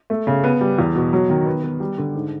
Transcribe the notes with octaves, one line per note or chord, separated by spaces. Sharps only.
A3
C#3
B3
G3
E2
B2
F#3
D#3
B3
B3
G3
D3
G#2